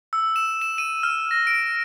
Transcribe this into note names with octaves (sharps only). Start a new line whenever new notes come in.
E6
E7
E7
D#7
F6
A#6
D7